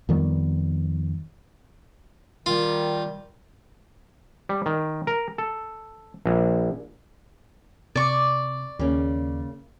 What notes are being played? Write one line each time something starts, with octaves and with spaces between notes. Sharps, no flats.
F2 D#3 G3 B3
D#3 G3 F4
G3
D#3
A#4
A4
A#1
C3 D5 C#6
D#2 C#3 A#3 C#4